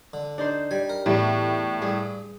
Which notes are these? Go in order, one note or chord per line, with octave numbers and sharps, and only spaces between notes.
D3
D4 D#4 C5
G3 G#5
A#4
E2 A2 G3
G2 G#4